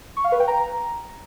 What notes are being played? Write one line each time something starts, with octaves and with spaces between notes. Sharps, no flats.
C#6
F5
B4
G5
A#5